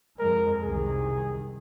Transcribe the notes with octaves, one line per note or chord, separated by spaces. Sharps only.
F2 G#3 A#4
C2 C3 D#3 G#4